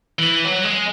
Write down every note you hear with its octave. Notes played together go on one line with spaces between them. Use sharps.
E3
F#3
G#3